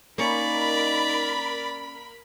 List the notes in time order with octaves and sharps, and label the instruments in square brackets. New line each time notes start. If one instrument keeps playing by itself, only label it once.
[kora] A#3 C#4 [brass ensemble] D#4 [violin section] A#4 B5 [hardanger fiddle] D5